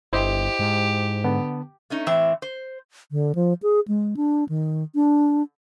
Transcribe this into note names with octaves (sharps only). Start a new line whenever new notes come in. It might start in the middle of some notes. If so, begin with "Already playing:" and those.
G1 E4 G4 C5 D#5
G#2
D3 B3 A5
A3 C#4 D#4
A2 E3 C4 E5
C5
D3
F3
G#4
G#3
D4
D#3
D4